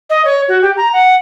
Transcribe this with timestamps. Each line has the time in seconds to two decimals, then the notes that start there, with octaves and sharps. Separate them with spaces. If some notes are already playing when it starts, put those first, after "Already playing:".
0.10 D#5
0.25 C#5
0.48 F#4
0.62 G4
0.77 A#5
0.93 F#5